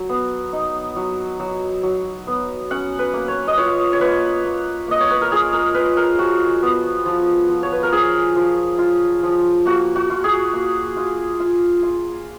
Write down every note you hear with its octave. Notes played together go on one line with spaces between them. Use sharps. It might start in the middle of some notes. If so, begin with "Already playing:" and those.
Already playing: F#3
B3
D#4
F#3
F#3
F#3
B3
C#4 F#5
B4
A#3
C#5
D#5
F4 C#5
C#5
A#3 B4
A#3
A#3 D#5
C#5
B4
A#4
F4 G#4
A#4
F4 B4
A#4
F3 F#4
B3
F3
F3
C#5
B4
A#4
F3 G#4
F3
F4
F3
A#3 F#4
F#4
F4
G#4
A#3
F4
F4
F4